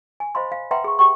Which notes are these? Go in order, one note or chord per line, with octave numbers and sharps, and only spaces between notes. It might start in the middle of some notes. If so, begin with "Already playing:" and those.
G#5
C5 D#5 F5 B5 C6
F5
B4 E5 F#5 G5 A#5 C6
G#4 C#6
G4 G5 C#6